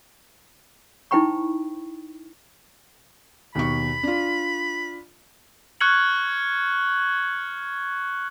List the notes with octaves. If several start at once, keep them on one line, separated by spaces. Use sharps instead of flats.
D#4 E4 C5 G5 B5 C#6
D#2 B2 B5 C#6
D4 F4
C#6 F6 F#6 G#6 C#7 F#7